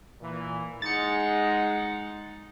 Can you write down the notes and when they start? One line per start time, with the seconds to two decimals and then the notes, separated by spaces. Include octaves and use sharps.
0.21 A#2 E3
0.82 G#3 D#4 F#5 A6 C#7